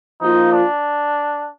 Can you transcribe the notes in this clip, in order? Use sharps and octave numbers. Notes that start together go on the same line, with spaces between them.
F3 A#3 D#4 F4
D4